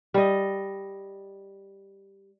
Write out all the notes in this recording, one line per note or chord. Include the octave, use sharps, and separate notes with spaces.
G3 D#5